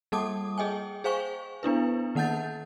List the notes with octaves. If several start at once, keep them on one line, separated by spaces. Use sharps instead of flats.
G3 A#3 A4 A5 D6 D#6
G#4 D#5 G5 G#5
G#4 C5 F5 G#5 C#6
B3 D4 E4 B4
D#3 A#3 F#5 A5 G6 A6